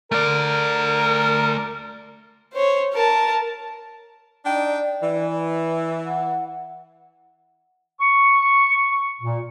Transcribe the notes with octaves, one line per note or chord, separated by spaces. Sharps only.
A3 A#4 D5
C5 C#5
A#4 A5
D4 D#4 D5 G5
E3
F#5
C#6
A#2